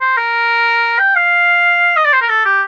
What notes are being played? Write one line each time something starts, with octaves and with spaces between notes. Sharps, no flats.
C5
A#4
G5
F5
D#5
D5
C5
A#4
A4
G4